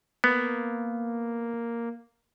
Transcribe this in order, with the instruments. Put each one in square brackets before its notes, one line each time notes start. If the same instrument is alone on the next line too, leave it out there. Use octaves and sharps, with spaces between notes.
[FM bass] A#3 [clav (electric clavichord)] B3